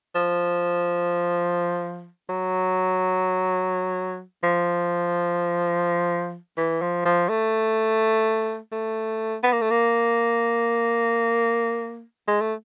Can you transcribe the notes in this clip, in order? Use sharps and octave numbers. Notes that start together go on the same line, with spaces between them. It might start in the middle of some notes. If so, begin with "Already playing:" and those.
F3
F#3
F3
E3
F3
F3
A3
A3
B3
A#3
A3
A#3
G#3
A3